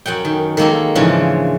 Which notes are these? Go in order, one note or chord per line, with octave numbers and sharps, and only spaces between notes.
F#2 C#4 F#5 G5
D#3
D#3 G#3 A#3 A4 A#4
G#2 C#3 E3 F3 C#4 D4